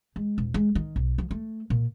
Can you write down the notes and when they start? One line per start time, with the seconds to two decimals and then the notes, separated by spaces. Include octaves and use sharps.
0.16 G#3
0.38 D#1
0.54 G#3
0.75 D#3
0.96 B1
1.18 F3
1.31 A3
1.70 A#2